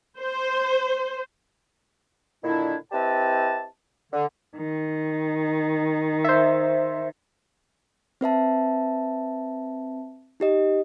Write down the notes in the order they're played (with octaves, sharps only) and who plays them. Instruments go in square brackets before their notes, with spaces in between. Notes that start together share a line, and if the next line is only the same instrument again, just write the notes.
[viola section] C5
[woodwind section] A#2 D3 D#3 D4 E4
C4 E4 G4 B4 D#5 A5
D3
[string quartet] D#3
[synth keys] C5 E5
[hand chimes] C4 B4 E5 A5
D#4 G4 D#5